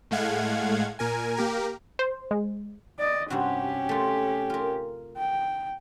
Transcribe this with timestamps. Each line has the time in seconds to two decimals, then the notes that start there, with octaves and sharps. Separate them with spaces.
0.11 A2 G#3 A3 F5 F#5 G#6
0.99 A#2 A#4 G#5
1.37 A#3 G4 A#4
1.99 C5
2.31 G#3
2.99 D5 D#5
3.30 G2 C3 C#4 F#4 G4
3.89 A3 F4
4.50 F4 A#4
5.17 G5